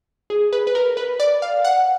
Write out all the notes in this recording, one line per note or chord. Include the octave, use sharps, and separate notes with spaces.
G#4
B4
B4
A#4
B4
D5
F5
F#5